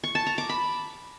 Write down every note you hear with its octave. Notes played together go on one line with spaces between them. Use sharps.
C#6
A5
A#5
D6
B5